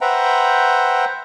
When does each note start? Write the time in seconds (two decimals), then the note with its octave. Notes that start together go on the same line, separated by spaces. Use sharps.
0.01 B4 C5 E5 F#5 G5 A#5